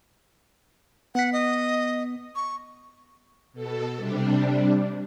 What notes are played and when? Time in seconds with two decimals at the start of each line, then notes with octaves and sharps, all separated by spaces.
1.15 B3 F#5 B6
1.33 D#5
2.36 C#6
3.53 B2 A4
3.96 C3 G3 D4